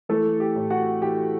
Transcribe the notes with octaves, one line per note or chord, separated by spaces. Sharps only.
E3 A3 A4
G4
A2
F#4 F#5
E3 G4 G5